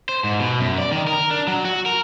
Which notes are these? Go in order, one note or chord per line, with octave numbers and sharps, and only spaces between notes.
C5
G#2
B2
F#2
D5
D#3
A#4
D4
F#3
F#4
A#4